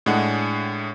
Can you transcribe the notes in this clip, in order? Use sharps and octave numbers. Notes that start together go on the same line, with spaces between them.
A2 G#3 D4 F#5